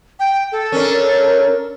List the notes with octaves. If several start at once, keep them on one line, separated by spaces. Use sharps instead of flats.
G5
A4
C#4 D4 A#4